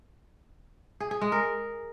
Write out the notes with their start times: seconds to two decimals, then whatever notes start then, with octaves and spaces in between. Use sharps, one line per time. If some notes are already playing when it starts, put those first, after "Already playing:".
1.00 G#4
1.11 G#4
1.21 G#3
1.32 A#4